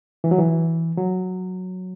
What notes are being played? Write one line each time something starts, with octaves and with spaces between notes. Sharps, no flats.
E3
F#3
E3
F#3